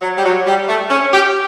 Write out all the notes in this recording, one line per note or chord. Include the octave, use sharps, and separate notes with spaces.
F#3
G3
F#3
G3
A3
C#4
G4